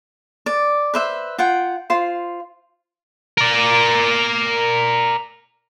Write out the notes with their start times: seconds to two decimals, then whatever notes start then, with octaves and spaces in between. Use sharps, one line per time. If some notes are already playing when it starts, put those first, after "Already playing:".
0.46 D5
0.94 B4 C5 E5
1.38 F4 F#5 G5
1.90 F4 C5 C6
3.38 A#4 D5